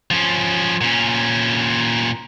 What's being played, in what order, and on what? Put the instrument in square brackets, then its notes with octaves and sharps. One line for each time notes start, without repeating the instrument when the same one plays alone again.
[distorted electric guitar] F3 C#4
A#2 C#4